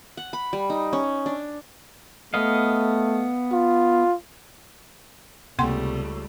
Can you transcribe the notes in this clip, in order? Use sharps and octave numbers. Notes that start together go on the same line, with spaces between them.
F#5
B5
G3
D#4
C#4
D4
A3 B3 D#5 F5
F4
C#2 C3 G3 A3 A#3 F#5 C6